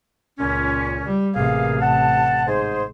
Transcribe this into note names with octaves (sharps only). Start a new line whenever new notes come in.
C#2 A#2 C#4
G3
A1 C3 A#3 G#4 F5
F#5 A5
G#2 G#4 C5